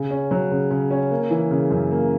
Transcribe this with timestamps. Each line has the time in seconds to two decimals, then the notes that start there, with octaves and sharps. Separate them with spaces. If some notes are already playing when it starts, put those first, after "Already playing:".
Already playing: C#3
0.10 C#4
0.31 F#3
0.51 C#3
0.71 C#3
0.91 C#4
1.11 A#3
1.30 E3
1.51 C#3
1.71 F#2
1.91 A#3